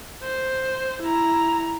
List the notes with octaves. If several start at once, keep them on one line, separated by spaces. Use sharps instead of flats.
C5
E4 A#5